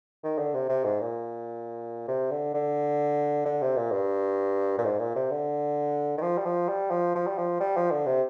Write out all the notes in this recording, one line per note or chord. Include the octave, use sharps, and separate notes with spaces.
D#3
D3
C3
C3
G#2
A#2
C3
D3
D3
D3
C3
A#2
G2
A#2
G#2
A#2
C3
D3
D#3
F3
G3
F3
G3
F3
F3
G3
F3
G3
F3
D3
C3